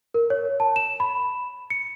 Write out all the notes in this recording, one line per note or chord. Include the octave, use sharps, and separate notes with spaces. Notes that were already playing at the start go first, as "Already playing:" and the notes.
A#4
C#5
A5
E7
B5
C#7